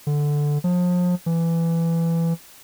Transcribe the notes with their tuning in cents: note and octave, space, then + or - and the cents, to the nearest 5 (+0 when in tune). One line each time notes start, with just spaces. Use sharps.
D3 +0
F3 +35
E3 +15